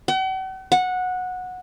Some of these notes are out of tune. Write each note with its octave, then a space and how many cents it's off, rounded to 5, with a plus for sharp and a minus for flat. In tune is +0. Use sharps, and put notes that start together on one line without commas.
F#5 +45
F#5 -15